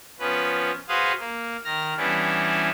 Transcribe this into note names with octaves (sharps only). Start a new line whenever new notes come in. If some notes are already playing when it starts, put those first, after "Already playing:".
F3 B3 C#4 B4
F#4 G#4 B4 C5 F5 D#6
A#3
D#3 F6 A#6
E3 G3 B3 C#4 D4 E4